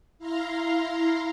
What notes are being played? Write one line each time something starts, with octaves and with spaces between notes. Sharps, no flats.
E4 F5 A#5 C6